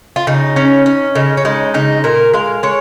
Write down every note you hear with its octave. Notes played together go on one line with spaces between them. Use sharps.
F4
C#3 D#4
C#4
C#4
C#3 D#4
C#4
G#3 D#4
C#3 D#4
A#2 A#4
G#3 F5
G#3 C#5